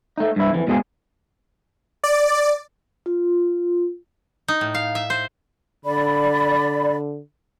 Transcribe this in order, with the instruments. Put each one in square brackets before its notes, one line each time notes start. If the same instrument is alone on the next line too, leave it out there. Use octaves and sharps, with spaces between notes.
[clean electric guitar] A3 D#4
G2 E4
F2 E3
G#2 B2 G#3 G4 G#4
[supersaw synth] D5
[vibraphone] F4
[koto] D#4
A2
F5
E5
C5
[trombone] D3 [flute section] D5 B5